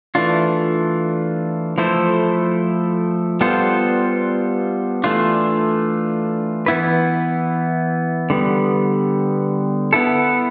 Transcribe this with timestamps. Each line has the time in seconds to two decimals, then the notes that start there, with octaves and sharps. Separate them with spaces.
0.15 E3 A3 D4 F4
1.78 F3 A3 E4 A4 C5
3.41 G3 B3 F4 A4 C5
5.04 E3 A3 D4 F4
6.66 E3 B3 E4 B4
8.30 D3 G3 B3
9.93 B3 E4 A4